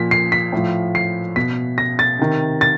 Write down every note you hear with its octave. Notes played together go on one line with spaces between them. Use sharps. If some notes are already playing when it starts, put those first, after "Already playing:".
Already playing: A#2 F3 B6
C7
B6
A2 F3
C7
B2 B6
A#6
A6
C3 D#3
A6